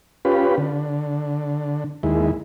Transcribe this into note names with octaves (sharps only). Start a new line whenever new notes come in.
C#4 F4 G4 B4
D3
D#2 G#3 E4